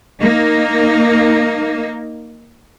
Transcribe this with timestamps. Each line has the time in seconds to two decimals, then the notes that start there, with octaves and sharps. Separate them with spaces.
0.20 A#3 D#4